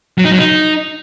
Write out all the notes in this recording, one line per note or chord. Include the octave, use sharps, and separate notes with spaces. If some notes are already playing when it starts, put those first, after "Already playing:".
F#3
D#4
F#3
D#4